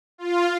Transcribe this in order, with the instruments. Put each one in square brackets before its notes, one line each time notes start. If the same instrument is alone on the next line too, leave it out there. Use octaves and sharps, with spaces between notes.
[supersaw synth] F4